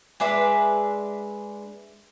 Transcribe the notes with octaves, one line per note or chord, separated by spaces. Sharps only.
G#3 D4 B4 E5